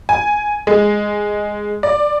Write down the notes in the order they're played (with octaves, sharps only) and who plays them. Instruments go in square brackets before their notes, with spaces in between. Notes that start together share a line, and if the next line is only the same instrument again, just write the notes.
[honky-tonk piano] G#5
G#3
D5